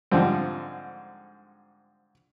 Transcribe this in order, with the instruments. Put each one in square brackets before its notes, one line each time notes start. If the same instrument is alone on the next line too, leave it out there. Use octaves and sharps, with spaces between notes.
[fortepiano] G#2 D3 F3 G3 C4